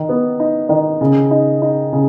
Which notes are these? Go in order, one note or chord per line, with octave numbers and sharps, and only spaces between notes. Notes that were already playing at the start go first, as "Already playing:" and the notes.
Already playing: D#3
B3
D#4
D#3
C#3
D#4
D#4
C#3